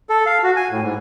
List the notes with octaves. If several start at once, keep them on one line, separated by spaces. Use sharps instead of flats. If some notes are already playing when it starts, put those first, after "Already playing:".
A4
F5
F#4
G#5
A2
G#2